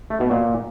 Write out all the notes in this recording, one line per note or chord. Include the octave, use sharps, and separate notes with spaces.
A3
B2
A#2